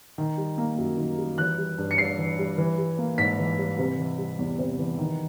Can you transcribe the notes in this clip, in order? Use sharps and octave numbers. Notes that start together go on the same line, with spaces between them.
D#3
G3
A#3
F#2
D#3
G3
E3 F#6
G3
G2
C#7
G2 C7
E3
G3
E3
G3
A#3
G#2 B6
E3
G3
C3
E3
G3
E2
C3
E3
D#3